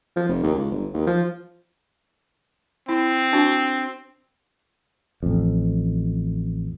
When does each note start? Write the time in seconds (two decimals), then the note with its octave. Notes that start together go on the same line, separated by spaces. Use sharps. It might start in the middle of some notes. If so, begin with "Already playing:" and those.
0.16 F3
0.28 F1
0.43 D#2
0.54 C#2
0.71 G1
0.94 D#2
1.06 F3
2.89 C4 E4
3.33 D4 F#4
5.23 A1 F2